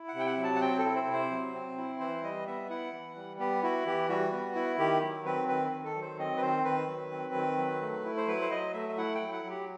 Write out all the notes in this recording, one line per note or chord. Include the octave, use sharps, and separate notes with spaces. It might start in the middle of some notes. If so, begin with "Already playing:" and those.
Already playing: E4
F#5
C3
G5
F#5
F#3
A5
F#5
C4 G5
A4
E4
C5
C3
C5
F#3
C4
E4
E3 C5
G3 D#5
B3 E5
E4 F#5
E3
G3
B3 G4
E4 F#4
E3 G4
G3 F#4
B3
E4
D#3 G4
F#3
C4 B4
D#3 B4
D#3
A4
F#3
C5
C4 D#5
B4
D#3 C5
D#3 B4
F#3
C4
D#3
F#3
A3
E4
C5
F#3 B4
C5
F#3 D#5
A3 E5
E5
E4 F#5
G5
F#3
F#5
F#3
G4